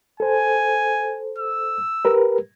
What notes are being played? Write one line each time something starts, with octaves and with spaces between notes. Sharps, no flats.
A4 C5 G#5
E6
G4 A#4 B4